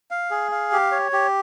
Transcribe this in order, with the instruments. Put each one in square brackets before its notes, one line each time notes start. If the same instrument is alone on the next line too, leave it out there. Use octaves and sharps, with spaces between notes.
[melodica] F5
G#4
F5
G4
C#5
G4